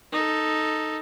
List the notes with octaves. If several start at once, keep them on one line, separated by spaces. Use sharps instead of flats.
D#4 A4